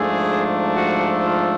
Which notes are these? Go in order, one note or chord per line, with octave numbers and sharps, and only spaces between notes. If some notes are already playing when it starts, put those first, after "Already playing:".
Already playing: G#2 F3 A3 D4 G#4
F#4
F4